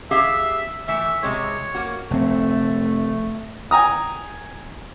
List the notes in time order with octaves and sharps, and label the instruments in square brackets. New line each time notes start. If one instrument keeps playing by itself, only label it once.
[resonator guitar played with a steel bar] G4 G#4 F5 [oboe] E5
[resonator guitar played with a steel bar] E3 A3 [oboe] E5
[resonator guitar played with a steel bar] C3 G#3 [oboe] C#5
[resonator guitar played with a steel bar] A#3 F#4
[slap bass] F1 C4 [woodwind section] A3
[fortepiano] G5 G#5 A#5 D#6